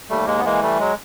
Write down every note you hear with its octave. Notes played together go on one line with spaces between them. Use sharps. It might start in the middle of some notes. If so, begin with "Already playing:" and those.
D#2 G3 A3
G#3 A#3
B3
E3 G#3 A#3
G3 A3
F#3 G#3